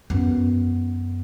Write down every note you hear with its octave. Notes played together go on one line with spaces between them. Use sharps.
F#2 B3